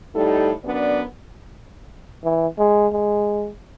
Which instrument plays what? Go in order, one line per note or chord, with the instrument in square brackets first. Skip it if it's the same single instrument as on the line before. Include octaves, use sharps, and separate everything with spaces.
[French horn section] A2 G3 D#4 A4
F#2 B3 D4 D5
[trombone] E3
G#3
G#3